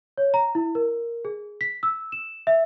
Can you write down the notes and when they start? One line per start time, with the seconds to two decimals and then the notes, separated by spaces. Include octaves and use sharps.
0.18 C#5
0.34 A#5
0.55 E4
0.75 A#4
1.25 G#4
1.61 B6
1.83 E6
2.12 E7
2.47 E5